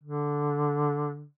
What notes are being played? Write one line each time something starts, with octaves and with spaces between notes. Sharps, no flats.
D3